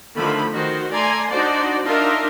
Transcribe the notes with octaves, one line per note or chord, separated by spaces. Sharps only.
D3 D#3 F3 A3 B5
D#3 F#4 C5
A3 D5 G#5 A#5 C6
D4 D#4 F#4 C5 D5
D4 D#4 F4 A#4 E5